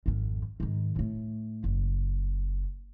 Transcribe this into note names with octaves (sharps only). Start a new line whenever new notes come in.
G#1 F2
G#2 D#3
A2 A3
F#1